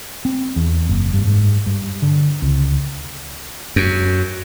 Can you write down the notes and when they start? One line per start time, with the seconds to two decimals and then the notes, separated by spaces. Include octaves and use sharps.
0.25 C4
0.56 E2
0.89 F#1
1.13 G2
1.27 G#2
1.66 G2
2.02 D3
2.42 C#2
3.76 F#2